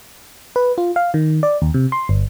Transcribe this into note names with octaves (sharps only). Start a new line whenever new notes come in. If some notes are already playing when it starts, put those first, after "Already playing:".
B4
F4
F5
D#3
D5
D#2
C3
C6
G1